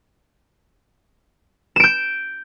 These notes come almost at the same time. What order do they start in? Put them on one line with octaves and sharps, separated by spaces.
E7 D7 G6